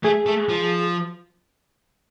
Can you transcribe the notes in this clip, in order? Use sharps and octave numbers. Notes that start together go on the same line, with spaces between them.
A3 G#4
A3
F3